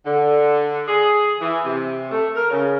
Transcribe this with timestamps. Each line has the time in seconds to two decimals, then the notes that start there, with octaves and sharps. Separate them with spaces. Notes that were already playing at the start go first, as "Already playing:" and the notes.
0.04 D3
0.87 G#4
1.40 E3
1.64 C3
2.11 A3
2.35 A#4
2.50 C#3